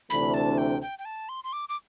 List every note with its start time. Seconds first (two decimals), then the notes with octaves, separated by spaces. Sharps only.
0.10 D2 C3 E3 A3 D4 B5
0.34 A5
0.58 G5
0.82 G5
0.99 G5
1.05 A5
1.29 C6
1.44 C6
1.53 D6
1.69 D6